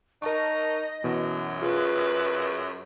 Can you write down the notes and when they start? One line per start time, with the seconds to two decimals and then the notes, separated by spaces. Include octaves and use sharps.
0.22 D#4 A#4 D#5 A5 C#6
1.04 F#2 B2 E3
1.62 F4 G#4 B4